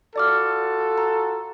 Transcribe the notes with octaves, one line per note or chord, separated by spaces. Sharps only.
F4 F#4 A4 D5 D6 F6
A#5